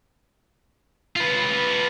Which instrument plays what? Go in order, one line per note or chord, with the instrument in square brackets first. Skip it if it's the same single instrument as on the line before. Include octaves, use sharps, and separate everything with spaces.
[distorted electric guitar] F4 B4